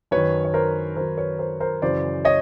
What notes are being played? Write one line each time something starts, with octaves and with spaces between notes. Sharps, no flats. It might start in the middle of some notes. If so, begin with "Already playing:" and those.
F#2 D#3 B4 C#5
C#5
A#4 C5
F#2 D#3 A#4 C5
B4 C#5
A#4 C5
A#4 C5
F#2 C#3 E3 C5 D5
C#5 D#5